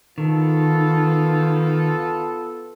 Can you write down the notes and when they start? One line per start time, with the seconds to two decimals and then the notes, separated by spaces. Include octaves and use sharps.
0.18 D#3 B3 F4 A4